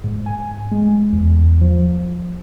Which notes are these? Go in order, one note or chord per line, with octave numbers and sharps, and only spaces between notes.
G#2
G#5
G#3
E2
F3